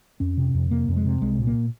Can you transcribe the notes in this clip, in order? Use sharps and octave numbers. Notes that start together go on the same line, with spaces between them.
F2 C#4
C3
F2
C3 A#3
F2
G#3
C3
C2 G#3
A#2
A#3